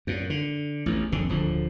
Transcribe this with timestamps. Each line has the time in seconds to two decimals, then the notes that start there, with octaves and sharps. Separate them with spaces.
0.07 F#2 A#2
0.30 D3
0.86 A1 E2
1.12 D#1 A#1 F2 D3
1.29 D1 D3 F3